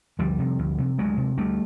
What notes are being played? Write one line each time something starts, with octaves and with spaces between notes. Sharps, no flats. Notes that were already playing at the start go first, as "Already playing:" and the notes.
D2 F3 G3
C3
D2
C3
D2 F#3 G#3
C3
D2 G3 A3